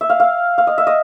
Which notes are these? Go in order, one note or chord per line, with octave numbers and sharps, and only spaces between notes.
E5
F5
F5
F5
D#5
E5
D#5